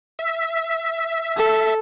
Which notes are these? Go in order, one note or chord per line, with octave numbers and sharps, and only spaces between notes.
E5
A4